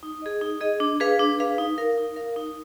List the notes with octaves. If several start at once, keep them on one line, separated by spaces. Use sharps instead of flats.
D#4
G#4 D#5
D#4
G#4 D#5
D4
G#4 B4 F5
D4
G#4 B4 F5
D#4
A#4 F5
D#4
A#4 F5
D#4